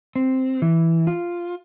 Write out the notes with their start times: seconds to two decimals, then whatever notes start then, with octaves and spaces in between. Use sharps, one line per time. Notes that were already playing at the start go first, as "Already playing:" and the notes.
0.16 C4
0.62 E3
1.07 F4